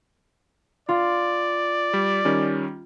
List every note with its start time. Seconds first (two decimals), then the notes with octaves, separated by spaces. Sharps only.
0.89 F4 D5
1.93 G3
2.25 D#3 G3 C#4